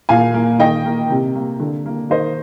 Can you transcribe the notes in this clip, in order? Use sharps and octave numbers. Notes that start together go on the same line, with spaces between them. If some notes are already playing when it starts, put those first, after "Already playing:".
A#2 F5 G#5
A#3
D#3 D#5 G5
A#3
C3
A#3
D3
A#3
D#3 C5 D#5